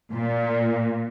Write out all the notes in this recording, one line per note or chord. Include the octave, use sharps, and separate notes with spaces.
A#2